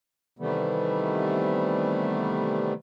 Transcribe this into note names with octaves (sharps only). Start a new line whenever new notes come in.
C3 D#3 E3 G3 A3 B3